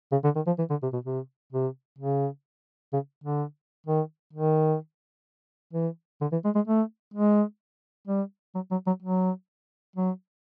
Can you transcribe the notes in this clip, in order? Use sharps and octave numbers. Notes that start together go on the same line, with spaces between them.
C#3
D3
D#3
F3
E3
D3
C3
B2
C3
C3
C#3
C#3
D3
D#3
D#3
E3
D3
E3
G#3
G#3
A3
G#3
G3
F#3
F#3
F#3
F#3
F#3